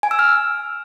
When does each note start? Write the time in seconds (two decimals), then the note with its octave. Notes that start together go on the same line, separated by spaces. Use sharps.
0.03 G#5
0.11 E6
0.19 F6